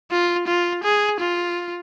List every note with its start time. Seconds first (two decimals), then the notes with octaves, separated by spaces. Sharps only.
0.12 F4
0.48 F4
0.84 G#4
1.20 F4